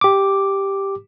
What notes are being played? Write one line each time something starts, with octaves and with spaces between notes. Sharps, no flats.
G4 D6